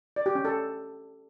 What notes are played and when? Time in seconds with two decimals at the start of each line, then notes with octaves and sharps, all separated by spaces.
0.16 D5
0.26 G4
0.35 C#4
0.45 A4